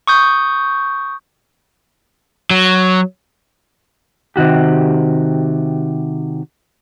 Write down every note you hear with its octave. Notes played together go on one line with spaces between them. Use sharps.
C#6 D#6 G6
F#3
C3 D#3 F#4 G4